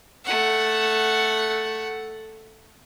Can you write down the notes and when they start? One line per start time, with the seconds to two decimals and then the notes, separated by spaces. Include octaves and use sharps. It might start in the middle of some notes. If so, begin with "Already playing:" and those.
0.25 A3 F#5